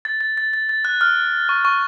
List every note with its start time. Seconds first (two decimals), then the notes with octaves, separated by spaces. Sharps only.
0.05 A6
0.21 A6
0.37 A6
0.53 A6
0.69 A6
0.85 F#6
1.01 F6
1.49 C#6
1.65 C#6